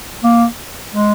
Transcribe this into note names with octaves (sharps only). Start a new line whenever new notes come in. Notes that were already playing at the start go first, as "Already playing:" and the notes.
A#3
G#3